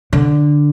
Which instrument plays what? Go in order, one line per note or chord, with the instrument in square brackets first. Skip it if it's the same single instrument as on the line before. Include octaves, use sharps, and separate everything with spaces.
[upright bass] D3